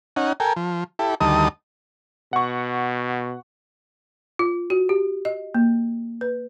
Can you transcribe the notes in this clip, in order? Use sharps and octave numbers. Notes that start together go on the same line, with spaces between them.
C#4 D#4 F#5
A4 A#4 G5 G#5
F3
E4 G4 A4
D2 D#3 G3 D#5 A5 D#6
B2 F#5 C#6
F4
F#4
G4
D#5
A#3
B4